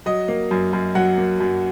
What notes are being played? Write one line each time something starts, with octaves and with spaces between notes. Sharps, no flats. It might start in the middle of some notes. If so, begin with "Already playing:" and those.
F#3 D#5
A#3
F#2
F#2
F#3 F#5
A#3
F#2